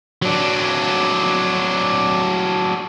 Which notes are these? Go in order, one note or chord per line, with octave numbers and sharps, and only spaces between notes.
F#3 D4